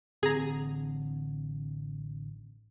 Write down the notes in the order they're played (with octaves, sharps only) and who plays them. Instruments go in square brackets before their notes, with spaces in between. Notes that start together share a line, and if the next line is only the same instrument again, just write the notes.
[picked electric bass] A1 D3 C4 [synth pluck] G#4 A#5